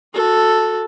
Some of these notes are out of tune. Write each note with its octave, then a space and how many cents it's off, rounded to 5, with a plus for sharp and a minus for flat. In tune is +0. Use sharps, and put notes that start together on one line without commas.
F#4 -25 A4 +0